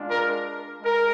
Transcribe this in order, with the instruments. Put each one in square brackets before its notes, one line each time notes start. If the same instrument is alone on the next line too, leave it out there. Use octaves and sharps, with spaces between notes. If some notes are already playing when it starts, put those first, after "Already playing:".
Already playing: [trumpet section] G#3 D4 F4
A#4
G#3 A#4